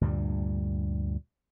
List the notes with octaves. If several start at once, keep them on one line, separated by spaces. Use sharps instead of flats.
D2 G2 A#2 G3